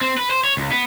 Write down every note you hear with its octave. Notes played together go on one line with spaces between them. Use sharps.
C4
B4
C5
C#5
C#2
B3